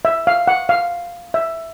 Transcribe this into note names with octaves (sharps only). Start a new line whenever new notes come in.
E5
F5
F#5
F5
E5